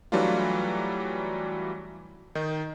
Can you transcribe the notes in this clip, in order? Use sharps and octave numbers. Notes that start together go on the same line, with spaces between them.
E3 F#3 G3 A3 D4 F4
D#3 D#4